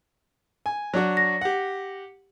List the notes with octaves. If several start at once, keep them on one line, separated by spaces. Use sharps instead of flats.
G#5
F#3 D4 F#4
A#6
G4 F#5